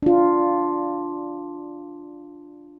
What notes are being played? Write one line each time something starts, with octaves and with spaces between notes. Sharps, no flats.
D4 F4